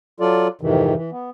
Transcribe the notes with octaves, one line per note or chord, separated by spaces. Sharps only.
F#3 F4 A4 D5
F2 G#2 C3 D#3 E3
E3
B3